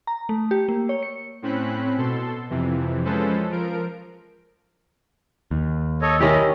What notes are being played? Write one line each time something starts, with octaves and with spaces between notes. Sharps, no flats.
A#5
A3
G4
A#3
C#5
C#7
A2 C4 C#4 B5 F#6
B2 A4 C6
F2 C3 E3
F3 G#3 C#4 A4 B4 C5
F3 A#4 D7
D#2
A4 C#5 D#5
D#3 C#4 E4 G4 D#5